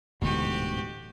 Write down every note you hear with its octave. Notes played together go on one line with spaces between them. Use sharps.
D1 D2 G#2 B2 E3 F#4 G4